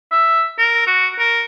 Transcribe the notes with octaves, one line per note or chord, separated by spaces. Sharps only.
E5
A#4
F#4
A#4